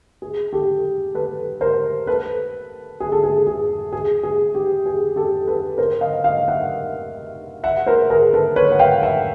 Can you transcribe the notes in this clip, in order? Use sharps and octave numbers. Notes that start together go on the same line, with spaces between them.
G#4
G4 A4
A4 B4
A#4 C5
A4 B4
G#4
A4
G#4
G#4
G#4
G#4
G4
G#4
G4 A4
A4 B4
A#4 C5
D#5 F5
D#5 F5
E5 F#5
E5 F#5
A#4 C5
G#4 A#4
A4 B4
B4 C#5
F#5
F5 G5
E5 F#5